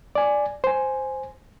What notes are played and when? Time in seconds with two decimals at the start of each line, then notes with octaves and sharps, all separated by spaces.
0.15 D5 G#5
0.64 C5 G#5